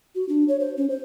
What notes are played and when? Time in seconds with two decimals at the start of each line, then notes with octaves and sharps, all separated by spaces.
0.15 F#4
0.29 D4
0.48 C#5
0.60 C5
0.77 C#4
0.90 C5